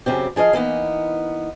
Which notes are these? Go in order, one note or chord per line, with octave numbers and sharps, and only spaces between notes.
F#2 C#3 C4 G4
F3 G#4 C5 D#5 F5
E3 A#3 B3 D#4